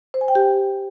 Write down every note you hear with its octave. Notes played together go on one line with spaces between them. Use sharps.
C5
G#5
G5
G4